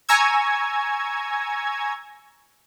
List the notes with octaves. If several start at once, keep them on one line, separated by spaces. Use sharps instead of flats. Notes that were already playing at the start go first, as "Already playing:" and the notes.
G#5 A#5 C#6 E6 G#6